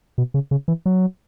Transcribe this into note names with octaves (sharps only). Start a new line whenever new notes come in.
B2
C#3
C#3
E3
F#3